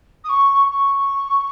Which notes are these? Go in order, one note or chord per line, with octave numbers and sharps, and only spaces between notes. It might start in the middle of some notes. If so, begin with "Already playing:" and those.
D#6
C#6
C#6